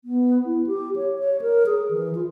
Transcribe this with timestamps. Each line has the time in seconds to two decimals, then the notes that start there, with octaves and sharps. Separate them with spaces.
0.05 B3
0.45 E4
0.67 G4
0.96 C#5
1.19 C#5
1.42 A#4
1.66 G#4
1.91 E3
2.15 F4